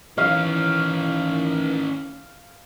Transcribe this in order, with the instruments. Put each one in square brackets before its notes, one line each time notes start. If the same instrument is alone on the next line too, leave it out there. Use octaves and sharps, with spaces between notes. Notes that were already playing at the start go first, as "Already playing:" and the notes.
[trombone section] D#3 E3 [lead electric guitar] C#4 E4 [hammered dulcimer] F5